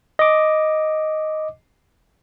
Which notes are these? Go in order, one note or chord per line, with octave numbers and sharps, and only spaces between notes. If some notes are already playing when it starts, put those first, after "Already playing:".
D#5 D6